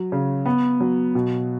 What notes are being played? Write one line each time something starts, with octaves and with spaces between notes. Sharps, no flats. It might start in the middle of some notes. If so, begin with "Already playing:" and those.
Already playing: F#3
C#3
B3
F#3
B2